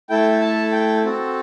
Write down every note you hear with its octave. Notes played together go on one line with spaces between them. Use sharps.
A3 E4 A4 G5
A5
G5
C4 F#4 A4